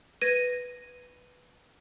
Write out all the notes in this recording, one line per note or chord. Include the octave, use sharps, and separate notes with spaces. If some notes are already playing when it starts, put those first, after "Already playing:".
B4 G#6 A#6 D#7